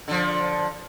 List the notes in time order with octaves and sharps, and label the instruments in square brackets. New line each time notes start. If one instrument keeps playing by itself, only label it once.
[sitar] D3 F3